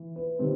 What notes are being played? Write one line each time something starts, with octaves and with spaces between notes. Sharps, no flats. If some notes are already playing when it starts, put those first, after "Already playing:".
Already playing: E3
B4
D#3 G3 C4